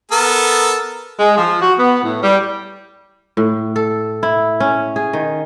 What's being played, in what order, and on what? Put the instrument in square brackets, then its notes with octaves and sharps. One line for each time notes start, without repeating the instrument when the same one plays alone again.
[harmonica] B3 A4 A#4
[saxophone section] G#3
F3
F#4
B3
A2
G3
[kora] A2
A4
E4
C#4
G#4
D#3